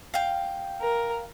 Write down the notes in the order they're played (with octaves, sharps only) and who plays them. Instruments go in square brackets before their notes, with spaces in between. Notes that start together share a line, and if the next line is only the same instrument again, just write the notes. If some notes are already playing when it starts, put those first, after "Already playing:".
[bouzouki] F5 G5
[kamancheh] A#4